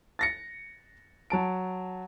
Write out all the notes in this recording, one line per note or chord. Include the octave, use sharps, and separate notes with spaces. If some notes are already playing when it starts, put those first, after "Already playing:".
A6 A#6 C#7
F#3 A5 D7